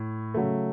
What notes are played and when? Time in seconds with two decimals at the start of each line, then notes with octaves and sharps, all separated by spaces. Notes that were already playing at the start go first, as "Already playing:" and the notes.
Already playing: A2
0.34 C#3 F#3 A3